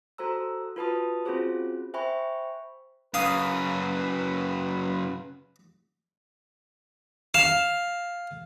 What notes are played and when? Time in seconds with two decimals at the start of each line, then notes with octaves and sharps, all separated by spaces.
0.18 F#4 A4 C5 A#5 E6
0.76 F4 F#4 B4 A5 B5 D#6
1.25 C4 C#4 F4 F#4 G#4 C5
1.94 C5 E5 G5 G#5 B5 C#6
3.14 F#2 C#3 B4 F5 D#6
7.34 F5 E7